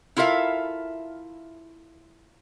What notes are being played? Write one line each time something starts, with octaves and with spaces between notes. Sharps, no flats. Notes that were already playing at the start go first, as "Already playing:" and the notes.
E4 F4 A4 A#4 E5 F5